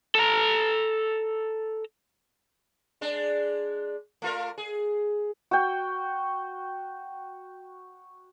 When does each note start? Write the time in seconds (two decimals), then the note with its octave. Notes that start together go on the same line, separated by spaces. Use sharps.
0.15 A4 A#5
3.01 G#3 D4
4.22 A3 F4 A#4
4.58 G#4
5.51 F#4 G5